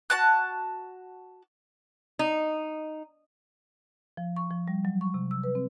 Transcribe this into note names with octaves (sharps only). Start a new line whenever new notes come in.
F#4 A5 F#6
D#4
F3
C#6
F3
G3
F#3
C#6
C3
E6
B4
C4